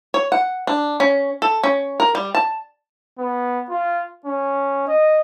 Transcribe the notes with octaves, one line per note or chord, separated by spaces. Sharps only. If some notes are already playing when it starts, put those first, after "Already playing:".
C#5
F#5
D4
C#4
A4
C#4
A#4
G3
A5
B3
F4
C#4
D#5